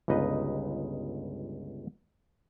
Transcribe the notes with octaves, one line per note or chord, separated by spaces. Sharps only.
G1 C#2 D#4 B4 D#5